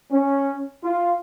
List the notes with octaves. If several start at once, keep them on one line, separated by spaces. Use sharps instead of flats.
C#4
F4